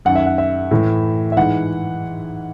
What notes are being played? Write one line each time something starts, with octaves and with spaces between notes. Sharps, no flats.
F#2 D#3 F#5
E5
F#5
E5
A2 E3
E5
G#2 E3 F#5